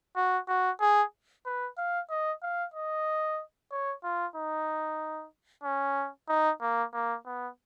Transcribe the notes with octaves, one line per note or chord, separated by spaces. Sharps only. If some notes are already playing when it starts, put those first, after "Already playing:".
F#4
F#4
G#4
B4
F5
D#5
F5
D#5
C#5
F4
D#4
C#4
D#4
A#3
A#3
B3